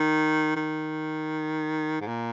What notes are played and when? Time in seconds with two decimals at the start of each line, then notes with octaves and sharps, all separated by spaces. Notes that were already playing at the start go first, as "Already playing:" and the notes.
Already playing: D#3
0.56 D#3
2.01 G#2
2.08 A#2